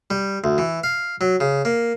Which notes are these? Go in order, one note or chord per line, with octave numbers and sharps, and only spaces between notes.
G3
D2
E3
F5
F#3
C#3
A#3